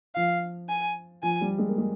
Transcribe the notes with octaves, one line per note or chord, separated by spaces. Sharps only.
F3 F5
G#5
F3 G#5
G3
G#3
A#3
G#3